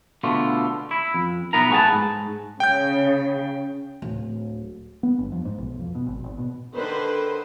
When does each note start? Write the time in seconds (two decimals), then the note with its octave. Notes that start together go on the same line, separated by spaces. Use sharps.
0.23 B2 D3 A3 F4
0.91 E4
1.14 F2
1.53 B1 B3 E4 A#4 A#5
1.70 A3 B3 G#4 B4 F#5 A5
1.92 G#2
2.60 C#3 G5 G6
4.02 D1
5.03 B3
5.19 G1
5.32 F2
5.45 G#2
5.58 B1
5.80 F2
5.95 B2
6.06 G#1
6.24 G#1
6.38 B2
6.76 D3 D#3 B4 C5